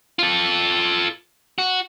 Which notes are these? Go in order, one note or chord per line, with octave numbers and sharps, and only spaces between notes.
F4 A4
F#4